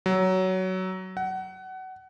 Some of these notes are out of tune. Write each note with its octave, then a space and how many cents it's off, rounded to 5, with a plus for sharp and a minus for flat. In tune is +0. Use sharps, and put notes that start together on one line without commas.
F#3 +15
F#5 +25